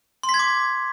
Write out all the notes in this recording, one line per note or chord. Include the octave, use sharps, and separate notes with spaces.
C6
B6
G#6
D6